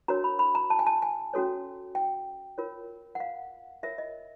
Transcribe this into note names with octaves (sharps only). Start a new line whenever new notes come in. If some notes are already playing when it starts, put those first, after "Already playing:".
D4 F#4 A#4 C#5 A#5
B5
B5
A#5
A5
G#5
A5
G#5
C#4 F#4 A4 C#5
G5
F4 A#4 C#5
F#5
F5
F4 A#4 C#5 E5
D#5